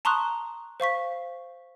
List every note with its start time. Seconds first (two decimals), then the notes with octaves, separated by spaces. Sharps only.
0.05 A5 A#5 C6 C#6 D#6 F#6
0.80 C5 F5 C#6 B6